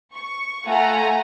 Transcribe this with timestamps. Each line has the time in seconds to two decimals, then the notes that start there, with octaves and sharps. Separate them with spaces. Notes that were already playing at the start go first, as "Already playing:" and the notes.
0.12 C#6
0.65 A3 F4 F#5 G#5 A#5